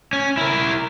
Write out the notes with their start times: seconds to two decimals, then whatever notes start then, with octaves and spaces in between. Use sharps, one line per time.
0.13 C#4
0.37 E4 A#4